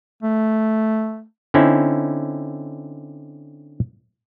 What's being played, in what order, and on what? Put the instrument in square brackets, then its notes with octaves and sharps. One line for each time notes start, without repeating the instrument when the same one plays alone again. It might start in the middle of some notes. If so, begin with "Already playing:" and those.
[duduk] A3
[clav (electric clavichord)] D3 C4 C#4 D#4 E4